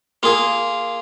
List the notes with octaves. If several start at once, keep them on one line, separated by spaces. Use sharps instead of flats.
A#3 F4 G#4